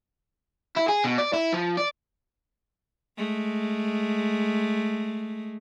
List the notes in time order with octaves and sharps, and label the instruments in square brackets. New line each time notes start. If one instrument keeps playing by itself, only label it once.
[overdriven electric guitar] E4
G#4
B2
D5
E4
F3
D5
[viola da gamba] G#3 A3